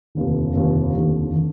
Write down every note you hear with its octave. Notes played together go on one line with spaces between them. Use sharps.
F1 D#2 D3
F1 D#2 D3
F1 D#2 D3
D3